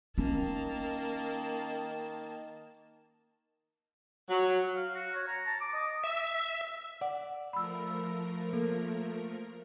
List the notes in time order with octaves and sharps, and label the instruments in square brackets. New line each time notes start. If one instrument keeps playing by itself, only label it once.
[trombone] D#3 [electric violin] A#3 A5 [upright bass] C#4
[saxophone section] F#3
[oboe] F5
F#4
C#5
A#5
A5
D6
D#5
[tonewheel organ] E5
[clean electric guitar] D5 [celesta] F#5
[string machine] F3 A3 A#4 [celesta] B5 E6
[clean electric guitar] A#3 [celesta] A4